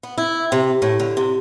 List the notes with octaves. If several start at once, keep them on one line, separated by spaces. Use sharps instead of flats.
B3
E4
C3
A2
D3
C3